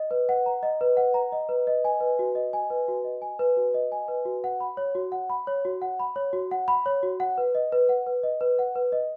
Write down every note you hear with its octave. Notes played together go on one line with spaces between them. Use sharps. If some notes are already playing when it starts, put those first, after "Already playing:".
Already playing: D#5
B4
F#5
A#5
D#5
B4
F#5
A#5
D#5
B4
D#5
G#5
B4
F#4
D#5
G#5
B4
F#4
D#5
G#5
B4
F#4
D#5
G#5
B4
F#4
F#5
B5
C#5
F#4
F#5
B5
C#5
F#4
F#5
B5
C#5
F#4
F#5
B5
C#5
F#4
F#5
B4
D#5
B4
F#5
B4
D#5
B4
F#5
B4
D#5